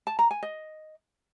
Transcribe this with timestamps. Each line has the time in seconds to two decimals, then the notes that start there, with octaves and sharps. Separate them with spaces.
0.07 A5
0.19 A#5
0.31 G#5
0.43 D#5